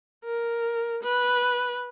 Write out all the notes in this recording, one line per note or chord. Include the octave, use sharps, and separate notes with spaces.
A#4
B4